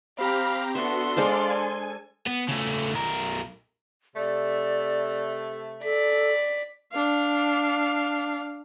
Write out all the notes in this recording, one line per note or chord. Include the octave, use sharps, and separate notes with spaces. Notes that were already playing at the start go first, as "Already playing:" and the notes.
C4 G4 F5 A#5 B5
B3 D4 F#4 A4 E5 C6
G#3 C5 D5 D#5 F5
G#5
B3
C#3 A3
B1 A#4
C3 A3 D5
A4 D5 B6
D4 F5